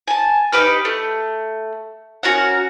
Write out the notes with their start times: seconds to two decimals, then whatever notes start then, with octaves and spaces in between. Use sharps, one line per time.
0.07 G#5 A5
0.52 D#4 G4 B4 F6
0.85 A3
2.23 C#4 F#4 A#4 F#5